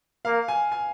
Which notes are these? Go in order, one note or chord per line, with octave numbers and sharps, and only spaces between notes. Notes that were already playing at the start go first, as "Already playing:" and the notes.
A#3 F5
G#5
G#5